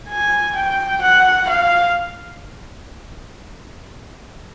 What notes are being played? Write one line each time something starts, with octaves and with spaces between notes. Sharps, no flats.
G#5
G5
F#5
F5